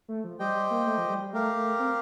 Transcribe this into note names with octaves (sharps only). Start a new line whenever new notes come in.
A3
F3
G3 G4 C5 D#5 G5
G3
A#3
A3
F3
G3
G3
A3 G4 A#4 F5
A3
C4